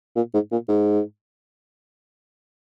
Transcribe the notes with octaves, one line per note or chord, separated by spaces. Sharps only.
A#2
G#2
A#2
G#2